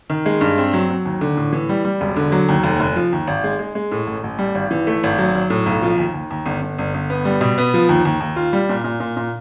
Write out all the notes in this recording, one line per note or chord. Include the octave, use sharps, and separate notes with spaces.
D#3
G#3
G2
C4
F#3
F#3
D#2
D3
A2
E3
G3
G3
E1
D3
F#3
D#2
F1
F1
F3
D#2
G#1
G#3
G#3
G#3
A2
A1
A1
G3
G#1
E3
A3
G#1
F#3
F#3
A2
B1
F3
D#2
D#2
D#2
G1
G1
G1
G1
B3
G3
B2
B3
F3
D#2
D#2
D#2
F4
G3
A#2
A#2
A#2
A#2